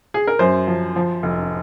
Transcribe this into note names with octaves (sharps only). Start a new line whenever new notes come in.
G#4
A#4
F#2 C5
F3
F3
F1